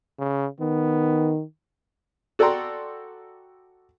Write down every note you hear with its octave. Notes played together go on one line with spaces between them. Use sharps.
C#3
D#3 B3
F#4 A4 D5 G5 A#5 C6